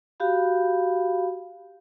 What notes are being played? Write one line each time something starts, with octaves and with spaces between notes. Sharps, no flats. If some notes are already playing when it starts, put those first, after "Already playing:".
F#4 G4 F5 B5